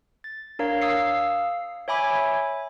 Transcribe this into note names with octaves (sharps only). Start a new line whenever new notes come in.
A6
D4 A#4 C#5 F5 A#5
F5 D#6 E6 C7 C#7
C#5 E5 G#5 B5 D6